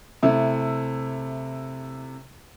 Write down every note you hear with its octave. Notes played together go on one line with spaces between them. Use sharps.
C3 A3 E4